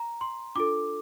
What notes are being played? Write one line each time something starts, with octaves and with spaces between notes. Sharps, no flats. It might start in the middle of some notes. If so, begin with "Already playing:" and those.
Already playing: A#5
C6
D4 F4 A4 D6